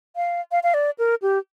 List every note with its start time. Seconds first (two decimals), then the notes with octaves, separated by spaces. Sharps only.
0.16 F5
0.52 F5
0.63 F5
0.74 D5
0.99 A#4
1.22 G4